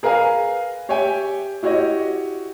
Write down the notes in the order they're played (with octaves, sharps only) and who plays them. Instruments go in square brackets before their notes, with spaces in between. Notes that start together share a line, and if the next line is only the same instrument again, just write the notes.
[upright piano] G#4 A#4 B4 F5 G#5
G4 C#5 E5 G5 G#5
E4 F#4 G4 C#5 D#5